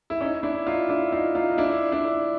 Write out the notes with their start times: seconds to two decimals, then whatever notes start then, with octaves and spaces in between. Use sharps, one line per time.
0.10 E4
0.21 C#4 D#4
0.43 D4 E4
0.66 D#4 F4
0.89 D4 E4
1.12 D#4 F4
1.35 D#4 F4
1.50 D#4
1.58 D4 E4
1.92 D4 E4